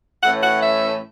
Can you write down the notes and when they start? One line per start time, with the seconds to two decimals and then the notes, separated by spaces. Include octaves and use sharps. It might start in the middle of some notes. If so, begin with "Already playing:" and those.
0.23 A2 E3 A3 C#4 F#5
0.41 F#5
0.61 E5